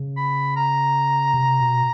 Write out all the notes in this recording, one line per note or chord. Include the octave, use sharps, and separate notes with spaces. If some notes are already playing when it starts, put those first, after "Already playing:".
Already playing: C#3
B5
A#5
C3
B2